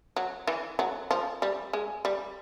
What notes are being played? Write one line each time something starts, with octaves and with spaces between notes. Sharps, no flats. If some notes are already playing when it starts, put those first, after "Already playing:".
F#3
E3
F#3
F3
G3
G#3
G3